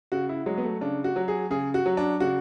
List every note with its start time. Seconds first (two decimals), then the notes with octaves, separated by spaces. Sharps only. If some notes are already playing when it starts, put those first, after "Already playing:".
0.12 C#3 F#4
0.29 E4
0.46 F#3 G#3
0.58 B3
0.64 A3
0.81 C#3 D4
1.04 F#4
1.16 F#3
1.28 G#4
1.50 C#3 G#4
1.74 F#4
1.86 F#3
1.97 D4
2.20 C#3 F#4